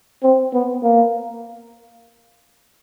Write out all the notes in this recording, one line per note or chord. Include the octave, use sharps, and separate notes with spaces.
C4
B3
A#3